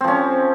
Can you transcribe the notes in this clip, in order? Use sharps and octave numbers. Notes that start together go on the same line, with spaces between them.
F3 C4 C#4